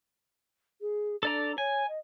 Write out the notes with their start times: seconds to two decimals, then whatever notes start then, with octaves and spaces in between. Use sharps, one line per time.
0.81 G#4
1.23 D4 A4 D5 A#5
1.58 C#5 G#5
1.88 D#5